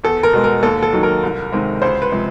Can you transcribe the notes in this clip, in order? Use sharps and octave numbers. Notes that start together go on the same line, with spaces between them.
E2 A4
A#4
B2 G#3
A#4
D#2 A4
A4
D#3 F#3
A#4
C2
C3 D#3 G#3
C#2 C5
B4
C3 F3 G#3